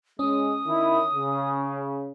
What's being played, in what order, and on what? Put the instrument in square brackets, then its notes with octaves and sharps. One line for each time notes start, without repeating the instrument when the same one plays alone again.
[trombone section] G#3 [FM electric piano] C#4 [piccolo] D#6
[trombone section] D#3 E4
C#3